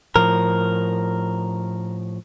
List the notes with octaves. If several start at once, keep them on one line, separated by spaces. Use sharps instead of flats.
A2 F3 A#4